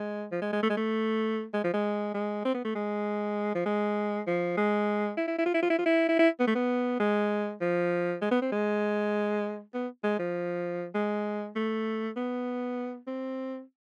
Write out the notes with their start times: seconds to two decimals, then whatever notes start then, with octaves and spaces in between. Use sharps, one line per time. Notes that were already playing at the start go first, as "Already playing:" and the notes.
Already playing: G#3
0.32 F3
0.42 G#3
0.53 G#3
0.63 A3
0.70 G#3
0.77 A3
1.54 G#3
1.64 F3
1.74 G#3
2.14 G#3
2.45 C4
2.54 B3
2.65 A3
2.75 G#3
3.55 F3
3.66 G#3
4.27 F3
4.57 G#3
5.17 E4
5.28 E4
5.38 E4
5.46 F4
5.54 E4
5.63 F4
5.70 E4
5.78 F4
5.86 E4
6.09 E4
6.19 E4
6.40 B3
6.47 A3
6.55 B3
7.00 G#3
7.61 F3
8.22 G#3
8.31 B3
8.42 C4
8.52 G#3
9.74 B3
10.04 G#3
10.19 F3
10.95 G#3
11.56 A3
12.17 B3
13.07 C4